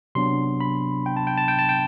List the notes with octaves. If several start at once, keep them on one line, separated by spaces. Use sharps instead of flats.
C3 F#3 B3 D4 C6
B5
G5
A5
G5
A5
G5
A5
G5